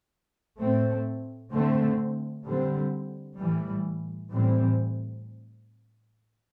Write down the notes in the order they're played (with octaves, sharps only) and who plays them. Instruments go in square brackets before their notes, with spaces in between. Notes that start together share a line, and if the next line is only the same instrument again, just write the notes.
[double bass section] A2 A3 C4
D3 A3 C4
D3 G3 C4
A2 E3 G3
A2 E3 G3 C4